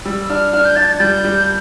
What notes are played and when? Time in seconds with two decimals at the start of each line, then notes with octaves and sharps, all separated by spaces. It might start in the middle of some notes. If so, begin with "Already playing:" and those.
0.05 G3 E6
0.29 D4 F6
0.53 D4 F6
0.65 G6
0.76 D4 A6
0.85 G6
0.88 A6
1.00 G3 G6
1.24 G3